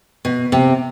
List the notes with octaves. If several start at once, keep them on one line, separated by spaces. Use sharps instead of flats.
B2
C3